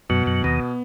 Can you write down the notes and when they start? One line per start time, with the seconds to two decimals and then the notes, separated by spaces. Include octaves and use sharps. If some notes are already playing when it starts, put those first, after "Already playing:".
0.09 F#2 B2 F#3
0.26 F#2 F#3
0.44 D#2 D#3 B3